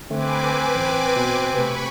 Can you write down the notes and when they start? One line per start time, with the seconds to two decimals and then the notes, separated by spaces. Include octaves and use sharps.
0.10 D3 A3 C4 B4 G#5 D6
0.75 A1 C5
1.16 B2
1.54 C3 A3 B5 C#6